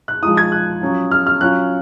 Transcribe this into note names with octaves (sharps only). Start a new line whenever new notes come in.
F#6
F3 G#3 D#4 D#6
G#6
F#6
F#3 C#4 F4
F6
F6
F#3 C#4 F4 F#6